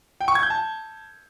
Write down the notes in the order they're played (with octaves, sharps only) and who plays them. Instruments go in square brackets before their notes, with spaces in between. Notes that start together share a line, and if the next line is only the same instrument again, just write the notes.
[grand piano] G5
C#6
G#6
G6
A5